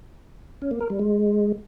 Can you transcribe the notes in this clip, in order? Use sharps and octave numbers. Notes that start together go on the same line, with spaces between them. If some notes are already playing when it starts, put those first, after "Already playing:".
C#4
A#3
A#4
G3
G#3